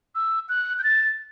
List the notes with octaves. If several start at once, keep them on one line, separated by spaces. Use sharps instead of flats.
E6
F#6
G6
A6